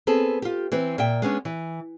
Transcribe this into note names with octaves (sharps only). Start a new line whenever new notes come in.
B3 C4 G#4 A4
F4 G4
E3 C4 B4
A#2 E5 G5
G#3 B3 C#4 D4
E3